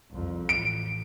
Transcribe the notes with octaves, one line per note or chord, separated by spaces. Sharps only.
C2 F2
A1 D7